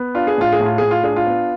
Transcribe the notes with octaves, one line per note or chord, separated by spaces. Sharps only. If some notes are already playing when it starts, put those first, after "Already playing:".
Already playing: B3
D4 F4
G#4
A2 F4
G#4
A2
F4
A2 G#4
F4
D4 G#4
F4
B3